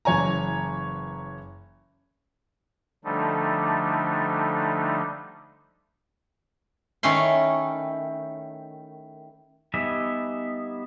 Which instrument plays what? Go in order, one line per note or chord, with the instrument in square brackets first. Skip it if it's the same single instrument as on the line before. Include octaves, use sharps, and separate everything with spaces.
[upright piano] F#1 E3 C#5 G#5 A#5
[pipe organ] D3 F3 G3 A3 D4 D#4
[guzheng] D#3 A3 C#4 E4 C6
[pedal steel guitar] G3 B3 D#4 E5 G#5